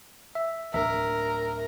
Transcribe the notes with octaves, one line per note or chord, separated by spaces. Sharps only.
E5
D1 D4 A#4 E5